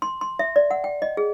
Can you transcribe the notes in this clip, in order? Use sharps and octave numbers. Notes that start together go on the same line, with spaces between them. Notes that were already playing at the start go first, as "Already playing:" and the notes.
C6
C6
E5
D5
F#5
G5
D#5
G#4